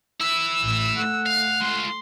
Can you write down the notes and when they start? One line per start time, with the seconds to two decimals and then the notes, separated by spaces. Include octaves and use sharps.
0.20 E4 B4 E6
0.62 A1
0.97 A3 F#5
1.26 F5
1.61 G#3 F4 C6